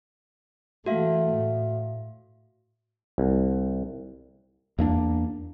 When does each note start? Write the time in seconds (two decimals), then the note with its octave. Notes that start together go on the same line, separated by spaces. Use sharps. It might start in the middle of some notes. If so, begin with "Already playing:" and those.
0.86 E3 A3 F#4 E5 F5
1.33 A2
3.18 C2
4.78 E2 A#3 D4